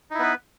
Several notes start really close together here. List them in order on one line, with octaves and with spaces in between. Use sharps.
D#4 E4 B3 B4